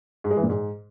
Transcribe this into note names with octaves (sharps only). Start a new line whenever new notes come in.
G#2
G#3
E3
A#2
G#2